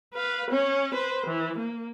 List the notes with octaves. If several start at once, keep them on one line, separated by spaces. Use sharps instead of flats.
B4 F5
C#4 C#5
B4 C5
E3
A#3